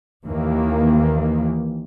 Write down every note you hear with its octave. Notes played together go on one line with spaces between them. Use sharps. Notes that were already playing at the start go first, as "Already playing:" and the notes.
D#2 D#3 E3 A#3